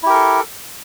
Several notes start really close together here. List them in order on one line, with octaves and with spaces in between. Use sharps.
E4 G4 A#4 A4